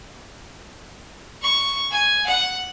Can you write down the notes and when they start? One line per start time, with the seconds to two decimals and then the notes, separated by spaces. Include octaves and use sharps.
1.42 C#6
1.91 G#5
2.26 F#5